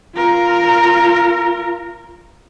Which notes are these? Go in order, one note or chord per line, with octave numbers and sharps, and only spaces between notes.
F4 A#4